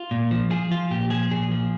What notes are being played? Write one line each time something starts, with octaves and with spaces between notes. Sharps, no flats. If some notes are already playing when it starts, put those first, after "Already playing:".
Already playing: F4
A#2
F3
F3 G#4
F3 F4
A#2 G4
F3 G#4
A#2 G#4
F3